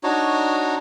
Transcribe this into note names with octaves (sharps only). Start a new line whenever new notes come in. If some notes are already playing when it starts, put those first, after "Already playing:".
D4 D#4 F#4 C#5